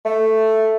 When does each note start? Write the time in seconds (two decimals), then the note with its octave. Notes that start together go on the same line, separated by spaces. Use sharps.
0.05 A3